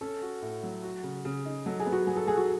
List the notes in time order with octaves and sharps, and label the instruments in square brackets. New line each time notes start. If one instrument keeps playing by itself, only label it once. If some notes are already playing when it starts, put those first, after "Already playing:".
[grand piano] C#4 [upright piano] A4
[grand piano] F#4
A2
F#3
F#4
C#3
C#3
D#4
[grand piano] F#3 [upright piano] A4
[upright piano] G#4
[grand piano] B3
[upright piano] F#4
[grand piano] F#3 [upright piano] G#4
[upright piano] A4
[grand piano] F#3 [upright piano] G#4
[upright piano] F#4